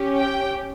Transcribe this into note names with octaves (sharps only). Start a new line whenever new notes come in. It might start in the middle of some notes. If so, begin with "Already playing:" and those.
Already playing: C#4 G4
G5